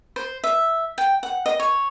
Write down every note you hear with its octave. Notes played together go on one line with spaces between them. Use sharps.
C5
E5
G5
F#5
D#5
C#5